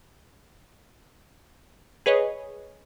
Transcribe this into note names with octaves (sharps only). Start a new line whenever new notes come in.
G#4 B4 C#5 D#5